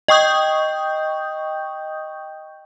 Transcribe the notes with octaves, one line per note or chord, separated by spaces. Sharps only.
D#5 G5 C#6 D#6 G6